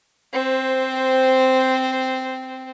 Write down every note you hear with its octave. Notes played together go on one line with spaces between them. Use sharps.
C4 C5